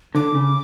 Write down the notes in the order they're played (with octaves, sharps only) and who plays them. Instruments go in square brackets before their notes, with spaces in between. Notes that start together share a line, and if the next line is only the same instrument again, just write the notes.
[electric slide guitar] D3 [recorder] D6
[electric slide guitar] C#3